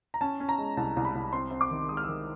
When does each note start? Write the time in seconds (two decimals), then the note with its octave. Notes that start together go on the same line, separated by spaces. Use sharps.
0.14 A#5
0.21 C#4 A5
0.40 C#4
0.49 A#5
0.58 G#3
0.77 C2 A5
0.96 C2
1.05 B5
1.15 C2
1.33 C4 C6
1.51 C4
1.61 D6
1.71 D#3
1.89 G#3 D#6
1.97 F6
2.03 D#3 E6